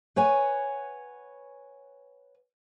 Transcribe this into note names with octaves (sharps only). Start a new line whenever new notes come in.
B4 C#5 F#5 G#5